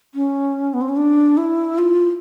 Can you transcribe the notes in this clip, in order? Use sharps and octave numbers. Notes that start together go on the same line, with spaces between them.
C#4
B3
C4
C#4
D4
E4
F4